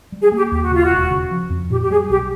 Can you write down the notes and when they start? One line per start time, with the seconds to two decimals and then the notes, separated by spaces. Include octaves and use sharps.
0.12 G3
0.22 G#4
0.32 A#3 G4
0.51 D#2 G4
0.63 F#4
0.71 C#3 F4
0.84 F#4
0.91 E1
1.11 C#3
1.31 F3
1.50 F2
1.70 A#2 G4
1.82 G4
1.90 G3 G#4
2.09 B1 G4